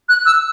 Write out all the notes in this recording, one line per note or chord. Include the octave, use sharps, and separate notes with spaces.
F#6
E6